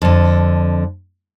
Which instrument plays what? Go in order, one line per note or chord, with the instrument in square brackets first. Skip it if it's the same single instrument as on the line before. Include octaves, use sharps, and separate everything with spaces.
[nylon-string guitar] F2 D3